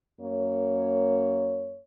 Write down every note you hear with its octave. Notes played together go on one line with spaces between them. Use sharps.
F#2 A#3 C#5